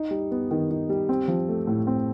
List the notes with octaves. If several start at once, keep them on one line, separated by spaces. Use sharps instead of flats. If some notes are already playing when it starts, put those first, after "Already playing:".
Already playing: D#4
G3
B3
D#3
D#4
G3
C4
F3
A3
A2
C4